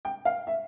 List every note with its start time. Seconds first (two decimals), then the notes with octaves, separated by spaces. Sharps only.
0.05 G5
0.25 F5
0.47 E5